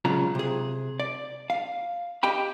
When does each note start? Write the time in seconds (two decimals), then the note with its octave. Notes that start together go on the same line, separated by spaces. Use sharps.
0.05 C#2 C#3 F#3 F4 A#5
0.35 C3 G#4
1.00 D5
1.50 F5
2.23 G4 D#5 G5 B5